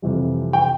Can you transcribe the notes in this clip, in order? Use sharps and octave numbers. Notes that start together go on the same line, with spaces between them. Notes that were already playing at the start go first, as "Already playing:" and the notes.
F2 C3 E3 G3
G5